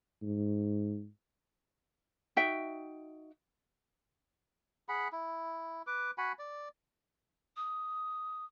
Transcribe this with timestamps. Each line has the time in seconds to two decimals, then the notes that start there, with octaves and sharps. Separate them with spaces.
0.23 G#2
2.36 D#4 F#4 E5 G5
4.89 G#4 F#5 B5
5.12 E4
5.87 B4 D6
6.18 F#4 F#5 G#5 B5
6.39 D5
7.57 D#6